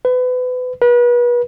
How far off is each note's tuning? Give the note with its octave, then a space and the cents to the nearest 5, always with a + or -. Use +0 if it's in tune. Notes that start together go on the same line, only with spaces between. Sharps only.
B4 +30
B4 -35